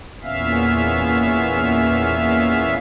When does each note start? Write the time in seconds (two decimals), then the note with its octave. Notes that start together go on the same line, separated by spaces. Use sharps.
0.23 E2 A#2 B3 C#4 E5 F5